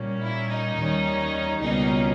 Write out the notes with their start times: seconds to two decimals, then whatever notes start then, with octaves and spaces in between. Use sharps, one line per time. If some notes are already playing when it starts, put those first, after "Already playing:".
Already playing: A#2 G3 A#3 C#4
0.20 E4
0.48 D#4
0.76 D#2 D#3 G3 C#4
1.60 C#2 B2 G3 A#3 C#4 D#4